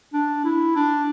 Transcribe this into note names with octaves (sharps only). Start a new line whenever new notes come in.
D4
E4
D4